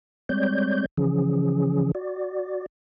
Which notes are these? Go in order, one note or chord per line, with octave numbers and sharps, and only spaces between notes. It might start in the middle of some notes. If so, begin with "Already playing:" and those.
G3 G#3 C4 C#5 D5 G6
C#3 E3 F3 C#4 G#4
F#4 D5